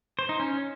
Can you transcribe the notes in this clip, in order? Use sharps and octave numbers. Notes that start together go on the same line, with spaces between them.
C5
D#4
C#4